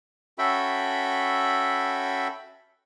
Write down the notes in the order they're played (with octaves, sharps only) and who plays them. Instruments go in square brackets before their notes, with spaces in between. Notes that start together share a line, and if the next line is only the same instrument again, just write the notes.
[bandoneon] C#4 F#4 A4 E5 G5 B5